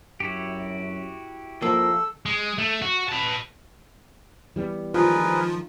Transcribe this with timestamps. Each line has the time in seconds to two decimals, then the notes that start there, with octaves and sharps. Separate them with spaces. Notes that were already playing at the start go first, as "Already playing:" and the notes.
0.20 F#2 E4 F#4 G4
1.62 F3 A#3 A4 E6
2.26 G#3
2.58 A3
2.82 F#4
3.09 B4 A5
4.56 E3 G3 B3
4.94 D#3 F3 G#3 F4 G#4 A#4 B4